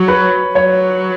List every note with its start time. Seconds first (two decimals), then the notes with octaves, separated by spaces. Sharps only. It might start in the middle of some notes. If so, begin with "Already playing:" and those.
Already playing: F#3 C#5
0.08 B4
0.55 F#3 C#5